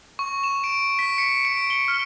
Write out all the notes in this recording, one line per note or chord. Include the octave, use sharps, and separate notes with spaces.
C#6
E7
D7
B6
C#7
D7
G7
F6